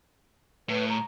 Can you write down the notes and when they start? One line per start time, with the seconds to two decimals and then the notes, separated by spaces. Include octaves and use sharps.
0.69 A2 B4
0.89 A#5